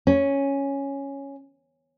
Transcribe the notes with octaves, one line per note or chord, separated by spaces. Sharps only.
C#4